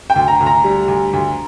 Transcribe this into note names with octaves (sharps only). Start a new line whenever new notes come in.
G5
D2
A#5
D2
A#5
G3
D2
D2